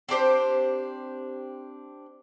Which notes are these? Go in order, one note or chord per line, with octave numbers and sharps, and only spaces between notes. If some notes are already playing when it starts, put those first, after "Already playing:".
C4 D4 G4 C5